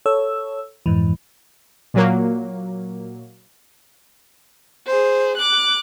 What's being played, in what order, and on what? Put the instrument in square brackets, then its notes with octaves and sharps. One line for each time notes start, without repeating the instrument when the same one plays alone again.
[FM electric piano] A4 C#5 E6
F2 G#2 E3
[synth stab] A#2 F#3 A#3
[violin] G#4 C5
D6 F#6